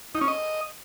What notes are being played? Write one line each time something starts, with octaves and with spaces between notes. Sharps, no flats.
D#4
C#4
D#5